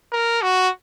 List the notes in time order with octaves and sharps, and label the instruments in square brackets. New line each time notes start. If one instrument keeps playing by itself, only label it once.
[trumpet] A#4
F#4